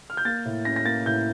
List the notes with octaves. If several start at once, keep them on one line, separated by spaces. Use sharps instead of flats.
F6
G6
A#3 A6
A2
C#4 A#6
A#6
A#3 A6
A2 G6